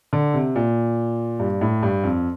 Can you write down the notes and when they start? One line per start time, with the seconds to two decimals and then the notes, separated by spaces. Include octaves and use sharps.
0.13 D3
0.34 C3
0.56 A#2
1.40 G2
1.61 A2
1.83 G2
2.04 F2